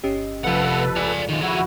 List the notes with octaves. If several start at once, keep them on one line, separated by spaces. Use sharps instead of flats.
G1 C#4 G4 D#5 E6 C7
C2 F2 F3 A3 A4 B4 F#5
C#2 D4 D5 G#5 D7
D#3 G#3 F4
F2 E4 F#4 G#4